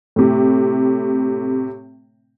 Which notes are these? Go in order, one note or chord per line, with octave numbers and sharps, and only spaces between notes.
A2 C3